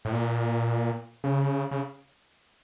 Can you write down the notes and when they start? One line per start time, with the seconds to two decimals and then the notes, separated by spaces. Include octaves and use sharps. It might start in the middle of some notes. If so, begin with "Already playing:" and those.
0.05 A2
0.13 A#2
1.24 C#3
1.71 C#3